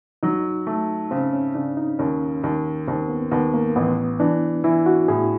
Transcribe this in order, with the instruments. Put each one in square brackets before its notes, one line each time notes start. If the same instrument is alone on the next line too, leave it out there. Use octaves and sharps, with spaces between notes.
[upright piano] F#3 [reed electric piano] D#4
[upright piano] A3
[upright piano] C#3 [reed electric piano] C4
[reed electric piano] C#4
[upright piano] C#3 [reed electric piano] D4
[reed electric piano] D#4
[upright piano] D#2 [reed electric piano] C#4
[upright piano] D#2
[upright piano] D#2 [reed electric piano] C4
[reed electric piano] B3
[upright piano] D#2 [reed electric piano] B3
[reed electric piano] A#3
[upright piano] A1 [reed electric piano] B3
[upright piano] E3 [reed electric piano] D4
[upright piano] E3 [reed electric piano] E4
[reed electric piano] F#4
[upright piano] A2 [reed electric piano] G#4